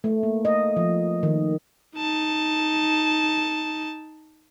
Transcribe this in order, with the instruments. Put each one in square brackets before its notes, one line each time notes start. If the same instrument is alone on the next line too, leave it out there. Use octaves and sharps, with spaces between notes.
[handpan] A3
A#3
D#5
F3
D#3
[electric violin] D#4 A5